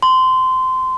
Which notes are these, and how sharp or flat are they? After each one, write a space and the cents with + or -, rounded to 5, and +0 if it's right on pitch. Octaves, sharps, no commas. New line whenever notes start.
C6 -20